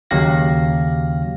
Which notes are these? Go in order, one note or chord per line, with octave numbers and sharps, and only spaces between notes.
D#2 C#3 F#3 G4 F5 A#6